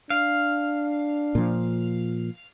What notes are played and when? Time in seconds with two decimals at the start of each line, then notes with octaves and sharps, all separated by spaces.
0.10 D4 F5
1.35 A#2 F3